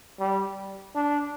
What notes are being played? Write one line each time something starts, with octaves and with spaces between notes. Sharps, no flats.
G3
D4